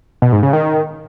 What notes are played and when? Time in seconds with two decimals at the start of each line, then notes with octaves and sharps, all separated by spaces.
0.22 B2
0.32 G#2
0.43 C#3
0.53 D#3